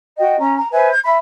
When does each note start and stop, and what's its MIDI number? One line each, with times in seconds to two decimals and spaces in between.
0.18 0.37 66
0.18 0.37 75
0.18 0.37 79
0.39 0.57 61
0.39 0.57 82
0.57 0.68 82
0.72 0.89 71
0.72 0.89 72
0.72 0.89 76
0.72 0.89 80
0.90 0.99 91
1.03 1.17 76
1.03 1.17 83